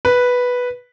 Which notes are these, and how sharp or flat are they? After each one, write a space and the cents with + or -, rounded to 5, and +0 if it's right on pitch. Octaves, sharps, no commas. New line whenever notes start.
B4 -5